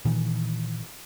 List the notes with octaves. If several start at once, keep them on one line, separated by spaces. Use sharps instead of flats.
A#2 D#3 E3